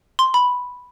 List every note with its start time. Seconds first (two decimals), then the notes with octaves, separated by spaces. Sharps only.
0.19 C6
0.34 B5